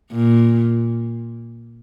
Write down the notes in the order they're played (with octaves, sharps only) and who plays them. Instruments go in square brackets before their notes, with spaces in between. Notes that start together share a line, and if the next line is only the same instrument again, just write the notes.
[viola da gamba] A#2